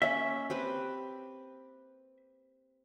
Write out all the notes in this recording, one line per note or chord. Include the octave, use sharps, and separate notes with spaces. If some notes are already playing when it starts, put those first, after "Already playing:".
A#3 C#4 E5
C4 G4 B4